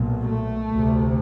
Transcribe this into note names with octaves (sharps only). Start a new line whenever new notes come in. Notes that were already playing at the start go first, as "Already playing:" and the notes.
Already playing: B1 A#2
A3
D2 C3